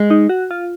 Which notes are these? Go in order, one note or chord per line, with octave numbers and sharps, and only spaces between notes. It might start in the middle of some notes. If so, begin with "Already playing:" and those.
Already playing: G#3
D#4
F#4
F4